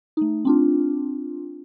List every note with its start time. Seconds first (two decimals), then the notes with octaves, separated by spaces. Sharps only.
0.17 A3 D#4
0.45 C4 D4 F4